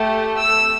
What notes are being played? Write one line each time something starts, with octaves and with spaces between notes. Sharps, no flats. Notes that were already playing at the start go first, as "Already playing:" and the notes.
Already playing: A3 G4
E6